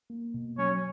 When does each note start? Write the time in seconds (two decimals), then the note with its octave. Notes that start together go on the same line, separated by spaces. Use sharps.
0.10 A#3
0.34 B2
0.58 F#3 C#4 C#5